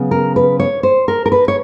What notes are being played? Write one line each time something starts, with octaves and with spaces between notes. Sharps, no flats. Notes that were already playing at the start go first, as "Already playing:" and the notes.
Already playing: C#3 F#3 B3
A#4
B4
C#5
C5
A#4
A#4
B4
C#5